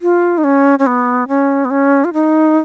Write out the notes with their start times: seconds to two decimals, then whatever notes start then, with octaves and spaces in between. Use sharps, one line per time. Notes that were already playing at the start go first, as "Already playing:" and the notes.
0.02 F4
0.38 D#4
0.44 C#4
0.79 C#4
0.87 B3
1.28 C#4
1.65 B3
1.71 C#4
2.05 F4
2.13 D#4